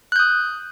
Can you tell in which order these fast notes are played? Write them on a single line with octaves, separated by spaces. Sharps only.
F#6 G6 D#6